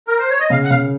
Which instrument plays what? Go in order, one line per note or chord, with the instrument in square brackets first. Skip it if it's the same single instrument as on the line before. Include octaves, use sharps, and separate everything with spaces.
[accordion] A#4
C5
C#5
D#5
[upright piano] C#3 [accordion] F5
[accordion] F#5
[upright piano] C#3 [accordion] F5